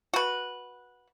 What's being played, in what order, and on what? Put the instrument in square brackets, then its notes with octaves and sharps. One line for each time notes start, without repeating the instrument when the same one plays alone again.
[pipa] F#4 B4